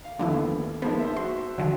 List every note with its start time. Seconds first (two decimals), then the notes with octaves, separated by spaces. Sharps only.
0.04 F5
0.19 D#2 D3 F3 A3 B3 E4
0.82 F3 G#3 A#3 B3 D#4 C5
0.99 C5 E5
1.17 F#4 C6
1.58 D3 D#3 F3 F#3